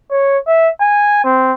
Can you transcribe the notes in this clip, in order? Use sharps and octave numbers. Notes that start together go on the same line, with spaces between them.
C#5
E5
G#5
C4